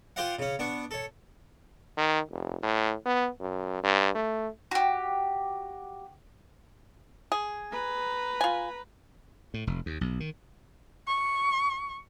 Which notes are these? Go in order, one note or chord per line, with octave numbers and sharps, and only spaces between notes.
F4 G4 C5 D5 F5 F#5
C#3 C#4
B3 D4 C#6
A4 C#5
D#3
F1
A2
B3
F#2
G2
A3
F#4 G4
G#4
B4 A#5
F4 G#5
A2
F1
D#2
B1
D#3
C#6